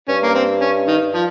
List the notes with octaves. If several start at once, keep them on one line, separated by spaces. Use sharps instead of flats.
G2 C#4
A#3
C4
C#4
D#3
F3